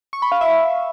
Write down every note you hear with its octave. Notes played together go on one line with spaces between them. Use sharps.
C#6
B5
F5
E5